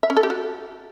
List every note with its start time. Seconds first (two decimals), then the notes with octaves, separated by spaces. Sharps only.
0.03 E5
0.10 C#4
0.17 A4
0.23 G4
0.30 F#4